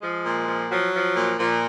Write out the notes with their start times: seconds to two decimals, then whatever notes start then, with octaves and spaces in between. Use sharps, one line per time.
0.02 F3 G#3
0.25 A#2
0.48 F3
0.71 F3 F#3
0.94 F3
1.16 A#2
1.39 A#2 F3